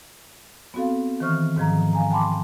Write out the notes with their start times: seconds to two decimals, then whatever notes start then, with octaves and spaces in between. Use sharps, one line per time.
0.74 B3 C4 F#4 A4 F5
1.20 D#3 E3 C5 C#6 F6
1.56 G#2 D#3 F3 A#5
1.93 F5 G#5 A#5
2.11 G5 A5 B5 C6 D6